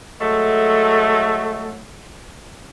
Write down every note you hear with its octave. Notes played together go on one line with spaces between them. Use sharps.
F#3 G#3 A3